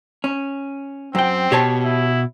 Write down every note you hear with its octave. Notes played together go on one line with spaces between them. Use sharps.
C#4
F#2 C4 G5
B2 G4 C#5 A5
E4